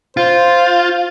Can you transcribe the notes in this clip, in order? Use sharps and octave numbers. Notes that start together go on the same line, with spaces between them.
F4 C5